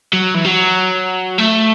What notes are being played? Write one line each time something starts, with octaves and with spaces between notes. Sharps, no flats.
F#3
E3
F#3
A3